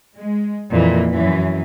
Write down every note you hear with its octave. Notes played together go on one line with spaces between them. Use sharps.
G#3
F2 A#2 E3 A#3
F#2 E3